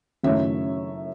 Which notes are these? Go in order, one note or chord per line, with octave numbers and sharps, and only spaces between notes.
F#1 F#2 D#3 A3 E4 C#5 E5